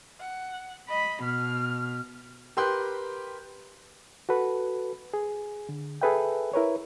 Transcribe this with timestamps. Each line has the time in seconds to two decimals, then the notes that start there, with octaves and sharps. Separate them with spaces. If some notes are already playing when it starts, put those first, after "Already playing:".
0.20 F#5
0.88 D#5 B5
1.23 B2 F6
2.57 G4 A#4 B4 C6 F#6 G6
4.29 F#4 A4 B4
5.14 G#4
5.69 D3
6.02 G#4 A4 B4 E5 G5
6.53 E4 A#4 B4 C#5